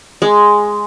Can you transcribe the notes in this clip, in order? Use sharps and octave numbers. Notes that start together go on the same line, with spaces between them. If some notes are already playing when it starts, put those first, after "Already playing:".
G#3